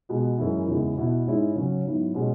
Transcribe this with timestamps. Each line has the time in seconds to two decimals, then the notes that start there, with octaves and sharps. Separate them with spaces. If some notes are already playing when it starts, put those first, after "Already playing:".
0.09 B2 G#3 B3 F#4
0.38 F#2 E3 G#3 E4
0.68 E2 C#3 G#3 E4
0.97 B2 B3 E4
1.26 G#2 G#3 C#4 E4
1.55 C#3 F#3 C#4
1.85 G#2 F#3 B3 E4
2.14 B2 G#3 C#4